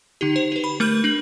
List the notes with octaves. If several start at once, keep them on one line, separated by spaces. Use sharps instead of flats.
D3 D#4 G4
C5
G4 B4
B5
A3 A#4 F6 G6
D4 F#7